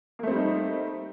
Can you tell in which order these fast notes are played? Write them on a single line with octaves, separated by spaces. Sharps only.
A#3 A3 C4 G3 D#4